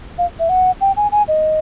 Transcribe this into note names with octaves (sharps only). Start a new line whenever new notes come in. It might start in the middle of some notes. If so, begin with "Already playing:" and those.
F5
E5
F#5
G5
G#5
G#5
D#5